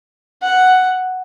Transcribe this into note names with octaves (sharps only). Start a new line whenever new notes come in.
F#5